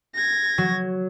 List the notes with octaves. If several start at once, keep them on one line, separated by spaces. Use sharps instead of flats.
G#6 A#6
F#3